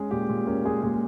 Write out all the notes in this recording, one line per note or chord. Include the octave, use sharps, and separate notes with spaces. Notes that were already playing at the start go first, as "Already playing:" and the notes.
Already playing: G#3 C#4 G#4
A#2 G4
A#2
C#4 A#4
G#3 G#4
A#2 G#4